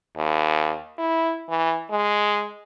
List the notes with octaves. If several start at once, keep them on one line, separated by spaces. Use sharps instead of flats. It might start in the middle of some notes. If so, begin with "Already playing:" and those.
D#2
E4
E3
G#3